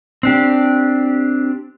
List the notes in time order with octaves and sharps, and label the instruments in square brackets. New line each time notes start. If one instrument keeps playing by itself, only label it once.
[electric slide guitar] C4 D4 G4